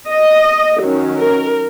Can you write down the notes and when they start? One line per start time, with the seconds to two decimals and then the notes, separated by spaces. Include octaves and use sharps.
0.10 D#5
0.81 D#3 F#3 C#4
1.18 A#4